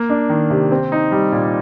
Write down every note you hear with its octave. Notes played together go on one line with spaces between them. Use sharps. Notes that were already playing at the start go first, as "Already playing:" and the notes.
Already playing: A#3
D4
D#3
C3
C4
D#4
G3
A#2